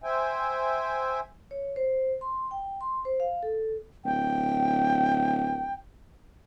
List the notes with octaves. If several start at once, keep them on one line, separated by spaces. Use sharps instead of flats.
C5 E5 G5 G#5
C#5
C5
C6
G5
C6
C5
F5
A4
D1 G5